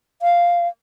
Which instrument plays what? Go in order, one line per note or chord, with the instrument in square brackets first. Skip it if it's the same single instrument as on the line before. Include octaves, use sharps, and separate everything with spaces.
[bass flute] F5